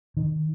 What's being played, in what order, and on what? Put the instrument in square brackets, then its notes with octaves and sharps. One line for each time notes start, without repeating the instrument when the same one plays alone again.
[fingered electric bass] D#3